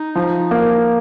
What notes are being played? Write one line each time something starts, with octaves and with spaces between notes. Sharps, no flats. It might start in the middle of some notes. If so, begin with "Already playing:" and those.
Already playing: D#4
F3
A#3